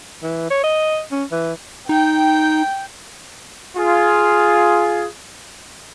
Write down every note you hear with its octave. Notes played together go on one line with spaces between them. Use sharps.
E3
C#5
D#5
C#4
E3
D#4 G5
F4 G#4